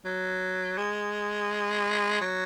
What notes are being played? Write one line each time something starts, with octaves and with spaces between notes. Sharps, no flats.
F#3
G#3
F#3